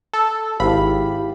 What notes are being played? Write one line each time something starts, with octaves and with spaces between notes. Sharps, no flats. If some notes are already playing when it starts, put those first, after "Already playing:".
A4
G#1 E4 G4 F5 B5